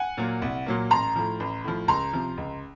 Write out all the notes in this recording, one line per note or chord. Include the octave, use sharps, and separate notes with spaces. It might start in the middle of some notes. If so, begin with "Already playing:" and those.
Already playing: F#5 G#5
A#2 F#3 A#3
C2
A#2 F#3 A#3
A1 A#5 C6
A2 F3
A1
A2 F3
C#2 A#5 C6
C3 F3
C#2